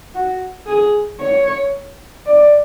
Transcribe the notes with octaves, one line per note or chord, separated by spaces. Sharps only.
F#4
G#4
C#5
D5